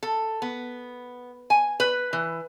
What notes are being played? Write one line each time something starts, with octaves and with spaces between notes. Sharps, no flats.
A4
B3
G#5
B4
E3